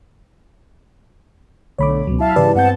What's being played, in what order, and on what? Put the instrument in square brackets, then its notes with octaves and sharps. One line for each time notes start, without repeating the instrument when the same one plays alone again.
[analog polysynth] B1 D3 A3 [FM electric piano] C#5 B5 D6
[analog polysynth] C#2 B2 [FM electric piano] F#3
[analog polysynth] E4 E5 F5 [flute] A5
[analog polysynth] G#2 C#3 E3 [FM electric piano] G4 B4 D5
[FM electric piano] G2 G6 [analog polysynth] B3 C4 A5 [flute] F#5